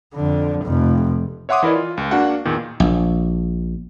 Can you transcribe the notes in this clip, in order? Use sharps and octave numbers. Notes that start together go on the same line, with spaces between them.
F2 D3
F1 F2
C#5 E5 F#5 C6 D6 D#6
E3 E4 A#4 D5 D#5
F4
C#2
A#3 D4 F#4 F5 F#5
E2 A#2 D#3
A#1